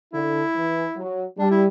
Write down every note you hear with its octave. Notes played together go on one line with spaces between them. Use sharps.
D3 E4
E3
F#3
G3 D4
E4